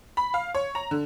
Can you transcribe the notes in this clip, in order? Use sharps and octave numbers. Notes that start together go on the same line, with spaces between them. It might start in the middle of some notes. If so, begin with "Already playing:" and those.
B5
F5
C#5
A#5
D3